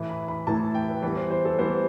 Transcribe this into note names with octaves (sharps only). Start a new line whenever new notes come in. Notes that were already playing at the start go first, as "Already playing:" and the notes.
Already playing: A2 E3 A3 E4
B5
B5
A2 E3 A3 E4 A5
G5
B4
E3 G3 B3 B4
C5
C5
A4
E3 G3 B3 C5